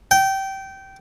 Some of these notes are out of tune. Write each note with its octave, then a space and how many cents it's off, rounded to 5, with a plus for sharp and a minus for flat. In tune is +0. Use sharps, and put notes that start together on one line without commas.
G5 -20